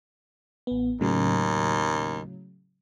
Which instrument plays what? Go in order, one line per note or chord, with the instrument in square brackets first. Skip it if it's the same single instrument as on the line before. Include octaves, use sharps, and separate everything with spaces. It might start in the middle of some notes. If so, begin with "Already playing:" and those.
[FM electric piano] A1 B3
[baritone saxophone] D#2 [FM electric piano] A2 C#3 F#3